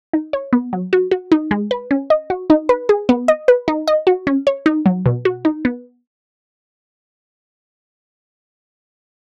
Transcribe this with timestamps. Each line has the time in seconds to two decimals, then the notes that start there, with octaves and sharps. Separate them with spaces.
0.13 D#4
0.33 C#5
0.53 B3
0.73 F#3
0.93 F#4
1.11 F#4
1.32 D#4
1.51 G#3
1.71 B4
1.91 C#4
2.10 D#5
2.30 F#4
2.50 D#4
2.69 B4
2.89 G#4
3.09 B3
3.28 D#5
3.48 B4
3.68 D#4
3.88 D#5
4.07 F#4
4.27 C#4
4.47 C#5
4.66 D#4
4.86 F#3
5.06 B2
5.25 F#4
5.45 D#4
5.65 B3